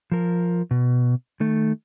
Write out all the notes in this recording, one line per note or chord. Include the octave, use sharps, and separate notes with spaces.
F3 A#4
B2
D#3 A3